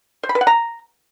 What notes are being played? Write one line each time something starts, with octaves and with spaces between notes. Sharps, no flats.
C5
B5
B4
F#5
A#5